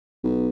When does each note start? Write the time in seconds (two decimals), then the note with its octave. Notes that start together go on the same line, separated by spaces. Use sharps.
0.24 B1